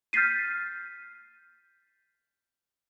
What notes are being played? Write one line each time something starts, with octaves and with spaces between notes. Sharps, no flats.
F6 G6 A6 B6 C7 D#7